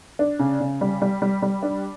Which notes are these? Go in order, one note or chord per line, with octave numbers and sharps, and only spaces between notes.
D4
C#3
C#3
G3
G3
G3
G3
D4